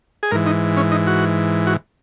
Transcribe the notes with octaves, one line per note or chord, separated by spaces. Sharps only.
G#4
G#2 E3 A#4
D#4
C#4
D#4
F#4
F#4